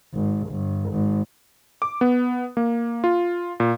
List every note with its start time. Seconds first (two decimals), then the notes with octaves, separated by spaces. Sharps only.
0.14 G#1
0.48 G1
0.90 G#1
1.82 D6
2.01 B3
2.57 A#3
3.04 F4
3.60 A#2